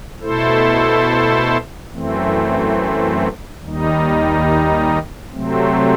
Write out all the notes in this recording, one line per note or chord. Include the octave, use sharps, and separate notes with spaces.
B2 A3 E4 A4 C5
F#2 E3 A3 C4
D#2 D#3 G3 D#4
C3 F#3 A3 C4